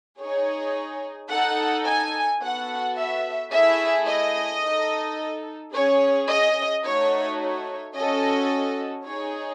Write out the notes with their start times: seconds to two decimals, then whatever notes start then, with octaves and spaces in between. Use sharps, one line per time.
0.19 D#4 G#4 C#5
1.30 D#4 A4 F#5
1.85 G#5
2.41 B3 F#4 A4 F#5
2.97 E5
3.52 A3 E4 G#4 E5
4.07 D#5
4.63 D#4 A4
5.73 C#4 G#4 C#5
6.28 D#5
6.84 A3 D#4 F#4 A4 C#5
7.40 C#5
7.95 C#4 F#4 A4 D#5
9.05 D#4 G#4 C#5